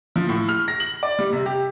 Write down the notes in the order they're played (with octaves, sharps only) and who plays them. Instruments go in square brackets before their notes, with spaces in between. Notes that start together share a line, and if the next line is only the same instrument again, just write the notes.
[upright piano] F3
A2
F6
A#6
F#7
D5
G3
C3
G4